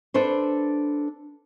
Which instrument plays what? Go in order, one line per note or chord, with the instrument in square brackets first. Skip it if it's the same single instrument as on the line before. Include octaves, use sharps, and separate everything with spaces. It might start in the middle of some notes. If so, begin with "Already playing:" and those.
[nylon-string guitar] D4 A4 B4 C5